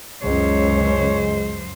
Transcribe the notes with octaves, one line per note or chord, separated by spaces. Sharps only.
C#2 F#2 G#3 C5 C#5